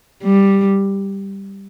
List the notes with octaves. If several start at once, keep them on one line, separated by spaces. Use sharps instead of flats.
G3